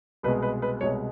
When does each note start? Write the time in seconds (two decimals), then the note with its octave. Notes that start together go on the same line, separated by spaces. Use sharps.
0.23 C2 B2 G#3 B4
0.42 B4
0.62 B4
0.81 C2 B2 G#3 C#5